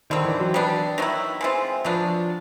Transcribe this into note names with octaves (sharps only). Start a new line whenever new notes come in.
D3 D#3 G3 C4
E3
F#3
G3 B3 D4
D#3 F#3 B3 E4
E3 G#3 C4 F4
F3 F#3 B3 D4